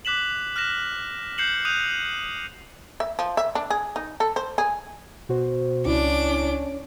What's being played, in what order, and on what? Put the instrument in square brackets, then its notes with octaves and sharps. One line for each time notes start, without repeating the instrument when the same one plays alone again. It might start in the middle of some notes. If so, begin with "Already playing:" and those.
[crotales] D6 F#6 B6 E7 F#7
F6 F#6 A#6 E7
F#6 G6 C7 C#7 E7 F#7
D#6 F#6 G6 D#7 F7
[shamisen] E5
F3
E5
D4
G#4
D#4
A4
C5
G#4
[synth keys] B2 F#4 C5
[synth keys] C#2 E4 [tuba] C#4 [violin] D4 D6